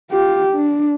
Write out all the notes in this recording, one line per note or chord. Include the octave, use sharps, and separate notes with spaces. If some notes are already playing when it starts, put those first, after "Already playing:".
F4 G4
D4